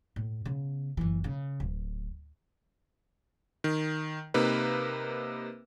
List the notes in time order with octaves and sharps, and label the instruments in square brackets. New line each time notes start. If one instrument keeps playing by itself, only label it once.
[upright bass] A2
C#3 B3
F#1 E3
C#3
D1
[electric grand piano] D#3
C3 A#3 D#4 B4